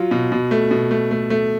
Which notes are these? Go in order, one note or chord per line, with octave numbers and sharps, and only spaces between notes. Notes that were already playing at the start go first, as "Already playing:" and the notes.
Already playing: F#3 F4
B2
B2
A3
B2
A3
A3
A3